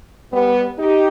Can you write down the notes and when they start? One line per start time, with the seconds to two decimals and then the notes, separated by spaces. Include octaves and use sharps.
0.32 G3 B3
0.78 D#4 G4